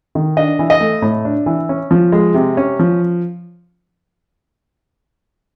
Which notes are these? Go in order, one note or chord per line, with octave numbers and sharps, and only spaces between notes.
D#3
D4 D#5
E3
D#5
A3
A2
D4
E3
C#4
F3
G#3
C3
C#4
F3